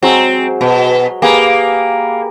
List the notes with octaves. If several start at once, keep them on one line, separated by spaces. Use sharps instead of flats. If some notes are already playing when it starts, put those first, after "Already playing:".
F#3 G#3 C4 G#4
B2
A#3 G4 G#4 B4